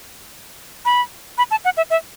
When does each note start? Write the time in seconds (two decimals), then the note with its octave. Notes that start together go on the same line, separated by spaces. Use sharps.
0.85 B5
1.38 B5
1.51 A5
1.65 F#5
1.77 E5
1.90 E5